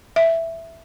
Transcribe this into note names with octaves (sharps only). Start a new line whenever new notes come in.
E5